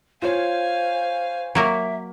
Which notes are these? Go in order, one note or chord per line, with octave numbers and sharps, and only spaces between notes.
F4 C5 C#5 F5 G#5
F#3 A#3 A#4 E5